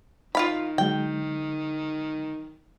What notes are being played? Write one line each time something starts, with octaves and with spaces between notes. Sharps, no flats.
D#3 F4 F5 B5
D3 F#3 G#3 G5